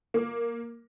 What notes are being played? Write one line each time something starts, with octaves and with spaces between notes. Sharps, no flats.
A#3 D6